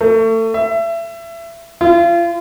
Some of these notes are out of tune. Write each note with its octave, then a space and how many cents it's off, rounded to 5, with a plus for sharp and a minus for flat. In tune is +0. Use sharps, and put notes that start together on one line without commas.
A3 +30
E5 +25
F4 -35